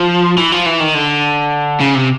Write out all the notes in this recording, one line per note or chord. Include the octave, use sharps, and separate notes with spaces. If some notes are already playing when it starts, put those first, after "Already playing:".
Already playing: F3
E3
F3
E3
D#3
D3
C#3
C3